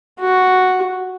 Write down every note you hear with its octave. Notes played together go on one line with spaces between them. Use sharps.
F#4